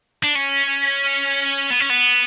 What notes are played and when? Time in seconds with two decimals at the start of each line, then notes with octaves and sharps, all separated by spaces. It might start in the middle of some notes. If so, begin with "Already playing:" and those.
0.23 D4
0.35 C#4
1.70 B3
1.80 C#4
1.90 B3